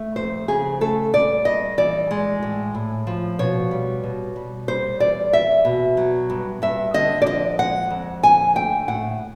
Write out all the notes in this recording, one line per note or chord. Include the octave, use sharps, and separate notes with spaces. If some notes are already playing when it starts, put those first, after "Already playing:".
Already playing: A3
F2 C5
C#3 G#4
A3 A4
G2 D5
G2 D#5
E3 D5
G#3
A2
A2
F3
B2 C#5
G3
B2
G3
G3 C5
E2 D5
E2 E5
B2
F#3
G2
G2 E5
D3 D#5
D5
F3 D#5
G#3 F#5
F2
D3 G#5
A3 G5
A2 F#5